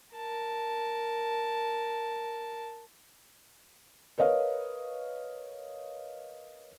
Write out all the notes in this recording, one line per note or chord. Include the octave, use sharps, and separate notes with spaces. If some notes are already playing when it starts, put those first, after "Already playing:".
A#4 A5
A#4 B4 C#5 D#5 F5